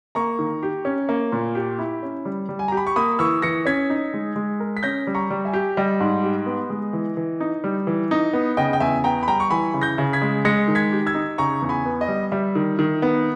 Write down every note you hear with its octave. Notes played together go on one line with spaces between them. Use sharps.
A#3 A#5 C#6
D#3
G4
C#4
A#3
A#2
G4
E4
C#4
G3
G3
G#5
G4 A#5
B5
C#6
A#3 B5 D#6
E3 C#6 E6
E3 A#6 C#7
C#4 G#6 B6
D#4
G#3
G#3
A#4
B6
C#4 G6 A#6
G3
A#5 C#6
G3
E5 G#5
G4
G3 D#5 G5
G#2
G4
B3
G#3
E3
E3
D#4
G3
E3
D#4
B3
C#3 D#5 G5
G5
E2 E5 G#5
B3 G5 A#5
B5
G3 G5 A#5
C#6
E3 G#5 B5
C#3
G6 A#6
C#3
G#6 B6
G#3
G#3 A#6 C#7
D#3
G#6 B6
G4
E6 G#6
D#4
C#3 A#5 C#6
E2
G#5 B5
B3
D#5
G3
G3 E5
D#3
D#3
B3